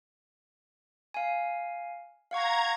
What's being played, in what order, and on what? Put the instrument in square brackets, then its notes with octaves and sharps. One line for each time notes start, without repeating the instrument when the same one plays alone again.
[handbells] F5 G#5
[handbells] F5 F#5 C#6 [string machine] A#5 G#6